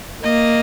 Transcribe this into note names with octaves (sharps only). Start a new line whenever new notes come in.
A#3 D#5